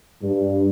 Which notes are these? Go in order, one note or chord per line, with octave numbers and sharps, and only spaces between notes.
G2